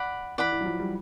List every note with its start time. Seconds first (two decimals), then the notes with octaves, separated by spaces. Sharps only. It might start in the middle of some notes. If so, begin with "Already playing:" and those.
Already playing: D5 F#5 B5
0.38 E3 D5 F#5 B5
0.52 E3
0.61 F#3
0.66 F3
0.79 G3